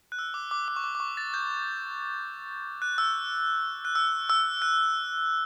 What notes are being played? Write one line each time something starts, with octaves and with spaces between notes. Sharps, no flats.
F#6
E6
D6
D6
D6
C#6
D6
D6
C#6
A6
G6
F#6
E6
F#6
E6
E6
F#6